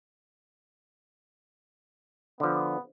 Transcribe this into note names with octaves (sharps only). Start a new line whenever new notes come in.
D3 F3 B3